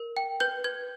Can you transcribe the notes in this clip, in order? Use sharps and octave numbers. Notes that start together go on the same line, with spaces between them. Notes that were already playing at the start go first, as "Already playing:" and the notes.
Already playing: A#4
G5
B4 G6
B4 G#6